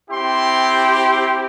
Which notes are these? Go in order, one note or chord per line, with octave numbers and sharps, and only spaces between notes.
C4 E4 G4 C6
C6